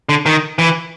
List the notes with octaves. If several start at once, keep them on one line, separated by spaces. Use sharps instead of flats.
D3
D#3
E3